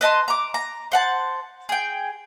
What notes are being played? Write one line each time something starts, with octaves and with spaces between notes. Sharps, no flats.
B4 D#5 A5 C6
A#5 D6
A#5
C5 F#5 A5
G#4 G5